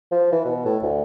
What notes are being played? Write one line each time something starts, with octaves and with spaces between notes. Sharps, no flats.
F3
E3
B2
A2
D2